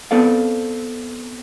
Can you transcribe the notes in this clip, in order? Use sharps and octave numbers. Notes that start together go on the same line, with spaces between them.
B3 C4 A4 D5 F5